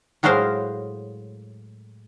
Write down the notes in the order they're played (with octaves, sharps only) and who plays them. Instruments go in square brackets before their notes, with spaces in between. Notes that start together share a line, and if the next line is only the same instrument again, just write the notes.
[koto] A2 F#3 G#3 A#4 C5 F5